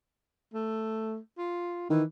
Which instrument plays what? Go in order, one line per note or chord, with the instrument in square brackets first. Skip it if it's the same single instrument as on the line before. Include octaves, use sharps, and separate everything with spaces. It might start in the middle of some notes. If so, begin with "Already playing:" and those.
[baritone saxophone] A3
F4
[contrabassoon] D#3 [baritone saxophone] E3